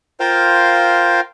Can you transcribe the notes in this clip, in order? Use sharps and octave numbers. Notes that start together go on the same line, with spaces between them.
F4 A#4 C5 F5 G5